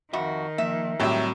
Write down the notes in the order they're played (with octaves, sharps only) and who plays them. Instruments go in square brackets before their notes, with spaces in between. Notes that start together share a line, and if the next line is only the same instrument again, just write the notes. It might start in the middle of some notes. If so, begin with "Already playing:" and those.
[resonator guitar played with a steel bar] F2 F#4 [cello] D#3 [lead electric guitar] E5
[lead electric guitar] F3 A#3 [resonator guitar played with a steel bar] E5
[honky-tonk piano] A2 F#3 [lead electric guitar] G3 C4 [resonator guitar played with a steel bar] G4 E5